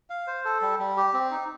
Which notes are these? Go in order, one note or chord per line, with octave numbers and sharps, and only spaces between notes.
F5
C5
A4
G3
G3
G4
C4
D#4